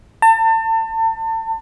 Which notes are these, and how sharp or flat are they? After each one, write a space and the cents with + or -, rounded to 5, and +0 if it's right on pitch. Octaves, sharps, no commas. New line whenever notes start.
A5 +35